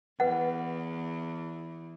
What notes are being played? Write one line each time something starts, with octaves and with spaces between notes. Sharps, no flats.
E2 B4 D#5 F#5